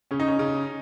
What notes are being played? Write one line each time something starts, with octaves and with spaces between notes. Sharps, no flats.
C#3 C#4
D#4
C#4
C#3